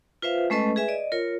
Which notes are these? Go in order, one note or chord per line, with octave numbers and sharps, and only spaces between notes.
F4 B4 C5 E5 F5
G#3 A3 C#4 A4 B4 D#5
G#4 B4 E5 G#5
D5 D#5
F4 A#4 C#5